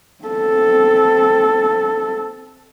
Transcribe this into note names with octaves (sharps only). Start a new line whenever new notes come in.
C4 A4